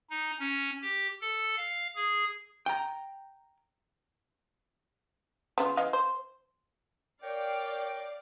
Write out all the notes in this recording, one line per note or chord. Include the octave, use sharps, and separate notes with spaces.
D#4
C#4
G4
A4
F5
G#4
G5 A#5
C#3 B3 F4
E3 D#5 F5
C5
A#4 C#5 D5 F5 G5 D6